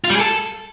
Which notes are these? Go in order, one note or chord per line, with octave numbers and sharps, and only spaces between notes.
F4
G3
G#4
A4